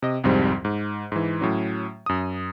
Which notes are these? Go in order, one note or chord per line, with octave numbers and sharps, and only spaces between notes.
C3 D#5
C2 F2 G#2 G3 C4
G#2
G#2 E3
A2 F#3 C#4
F#2 D#6